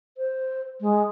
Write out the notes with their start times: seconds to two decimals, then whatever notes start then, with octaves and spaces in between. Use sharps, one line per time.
0.17 C5
0.81 G#3